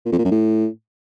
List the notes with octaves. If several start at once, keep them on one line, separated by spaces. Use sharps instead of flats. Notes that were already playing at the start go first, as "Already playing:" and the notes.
A#2
F2
A#2
F#2
A2